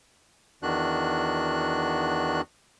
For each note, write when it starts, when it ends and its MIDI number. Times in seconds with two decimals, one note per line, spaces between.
0.63 2.41 40
0.63 2.41 51
0.63 2.41 62
0.63 2.41 66
0.63 2.41 90